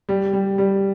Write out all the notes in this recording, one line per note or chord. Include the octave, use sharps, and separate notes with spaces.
G3
G3
G3